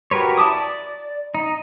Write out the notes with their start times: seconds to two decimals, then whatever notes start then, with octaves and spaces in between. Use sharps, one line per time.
0.11 F#4 G4 A#4 B4 C#5
0.38 E4 A5 D6 D#6
0.52 D5
1.35 D#4